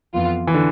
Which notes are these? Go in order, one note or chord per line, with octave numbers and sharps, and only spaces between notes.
F2 E3 B3 F4
E3
D3